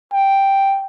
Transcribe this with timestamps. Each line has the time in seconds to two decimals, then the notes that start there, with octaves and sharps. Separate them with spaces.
0.13 G5